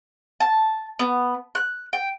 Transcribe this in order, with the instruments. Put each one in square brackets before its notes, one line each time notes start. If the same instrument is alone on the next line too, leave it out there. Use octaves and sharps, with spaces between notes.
[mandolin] A5
B3
F#6
G5